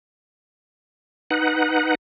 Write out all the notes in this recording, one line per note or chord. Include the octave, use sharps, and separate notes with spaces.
D#4 B4 F#5